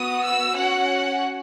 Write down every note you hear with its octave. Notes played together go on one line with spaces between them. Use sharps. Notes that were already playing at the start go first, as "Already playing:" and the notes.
Already playing: B3 F#4 D#6
E6
C#4 F#4 F#5